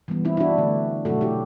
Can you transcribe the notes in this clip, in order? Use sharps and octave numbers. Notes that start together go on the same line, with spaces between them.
E3 G3 B3
C4 E4
E4
D4 F#4
D3 A3
B2 F#3 A3 F#4 A4
E4 G4